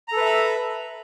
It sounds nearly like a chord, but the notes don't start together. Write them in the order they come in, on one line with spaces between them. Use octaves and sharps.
A#5 A4 B4 E5 B5